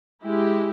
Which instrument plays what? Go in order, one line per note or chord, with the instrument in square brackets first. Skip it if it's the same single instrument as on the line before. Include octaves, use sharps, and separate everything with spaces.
[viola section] G#3 E4 G4